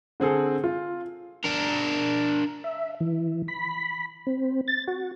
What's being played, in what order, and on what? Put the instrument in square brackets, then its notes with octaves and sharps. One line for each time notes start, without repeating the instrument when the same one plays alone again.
[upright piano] D3 C4 G#4 A4
F4
[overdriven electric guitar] D4 A#4
[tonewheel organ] E5
E3
B5
C4
A6
F#4